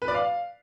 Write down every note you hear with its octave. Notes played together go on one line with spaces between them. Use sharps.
B4
D5
F5